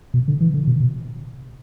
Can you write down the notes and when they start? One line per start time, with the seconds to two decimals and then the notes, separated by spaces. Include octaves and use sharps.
0.14 B2
0.28 D3
0.41 E3
0.54 D3
0.67 B2
0.80 B2